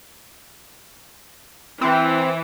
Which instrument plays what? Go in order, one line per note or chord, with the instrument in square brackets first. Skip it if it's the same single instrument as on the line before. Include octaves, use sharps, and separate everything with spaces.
[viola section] E3 [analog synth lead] C4